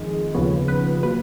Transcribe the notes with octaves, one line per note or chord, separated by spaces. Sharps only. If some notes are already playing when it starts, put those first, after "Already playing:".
Already playing: F2 D#3 G#3
D#2 C#3 F3 B3 C#5
B4
F#3 A#3 B4